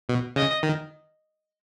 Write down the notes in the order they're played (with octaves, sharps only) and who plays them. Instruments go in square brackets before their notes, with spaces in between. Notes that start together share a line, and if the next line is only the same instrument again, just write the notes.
[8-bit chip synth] B2
[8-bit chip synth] C#3 [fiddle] D#5
[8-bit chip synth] D#3